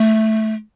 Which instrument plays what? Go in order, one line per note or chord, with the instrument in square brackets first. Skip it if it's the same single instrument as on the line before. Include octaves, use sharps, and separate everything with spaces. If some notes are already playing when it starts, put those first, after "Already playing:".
Already playing: [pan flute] A3